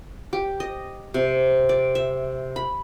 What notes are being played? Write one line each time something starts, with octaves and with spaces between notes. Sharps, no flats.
G4
D#5
C3
D5
E5
B5